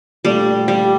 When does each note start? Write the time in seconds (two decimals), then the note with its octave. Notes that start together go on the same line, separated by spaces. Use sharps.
0.25 A#2 G3 A3 D4 A4
0.68 G3